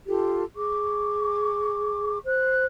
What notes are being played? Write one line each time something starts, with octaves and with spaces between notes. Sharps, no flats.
F4 G4 A4
G#4 C#6 D6
C5 F#6